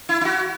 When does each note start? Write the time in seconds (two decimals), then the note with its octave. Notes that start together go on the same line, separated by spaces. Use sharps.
0.09 E4
0.21 E4
0.25 F#4